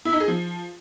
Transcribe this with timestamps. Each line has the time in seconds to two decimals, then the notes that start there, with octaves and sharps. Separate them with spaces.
0.05 E4
0.13 D#4
0.20 G#4
0.28 F3